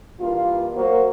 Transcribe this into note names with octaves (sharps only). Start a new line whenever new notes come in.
G2 E3 A#3 F4
F#3 A#3 F#4 A#4 C5